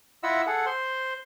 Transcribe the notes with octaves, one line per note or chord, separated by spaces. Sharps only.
E4 F4 D#5 E5 F#5 E6
G#4 A4 F#5
C5 C6